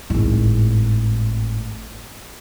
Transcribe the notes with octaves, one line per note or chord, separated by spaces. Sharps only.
G#1 A2